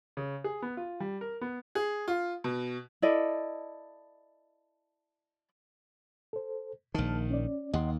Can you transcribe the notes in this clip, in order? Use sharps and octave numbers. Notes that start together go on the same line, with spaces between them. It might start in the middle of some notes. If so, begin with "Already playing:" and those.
C#3
G#4
B3
F4
G3
A#4
B3
G#4
F4
B2
E4 A4 D5 D#5
A4 C5
A#1 D#3 A5 F6
C#4 D5
D#2 D#5 F#5 C6